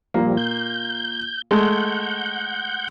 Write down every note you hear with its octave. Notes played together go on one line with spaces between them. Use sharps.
A#2 F3 G3 A#3
G6
G#3 A3 F#5 G6